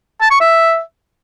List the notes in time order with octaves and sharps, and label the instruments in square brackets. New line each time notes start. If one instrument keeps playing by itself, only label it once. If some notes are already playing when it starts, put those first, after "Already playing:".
[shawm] A5
C#6
E5